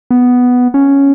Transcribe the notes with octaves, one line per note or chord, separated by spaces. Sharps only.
B3
C#4